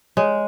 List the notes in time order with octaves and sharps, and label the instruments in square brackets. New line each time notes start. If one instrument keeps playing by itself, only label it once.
[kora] G#3 [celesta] C#5